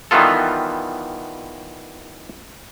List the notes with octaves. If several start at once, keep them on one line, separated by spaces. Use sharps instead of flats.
D#3 E3 G3 B3 F4 A4